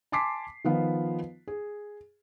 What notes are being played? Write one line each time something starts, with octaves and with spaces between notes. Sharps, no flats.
G#5 A5 C6 D6 B6 C7
D#3 F3 B3 F4
G#4